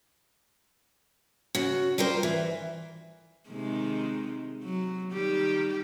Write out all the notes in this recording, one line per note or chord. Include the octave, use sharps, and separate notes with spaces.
C#3 F#4
G3 F4 A#4 C5
E3
C3 D#3 G#3
F#3
D#3 G3 G4